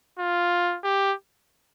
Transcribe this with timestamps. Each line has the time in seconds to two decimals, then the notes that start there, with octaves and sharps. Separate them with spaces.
0.19 F4
0.84 G4